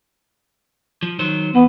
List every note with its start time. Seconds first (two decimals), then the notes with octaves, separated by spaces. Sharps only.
1.03 F3
1.19 D#3 F#3 C5
1.55 E2 B3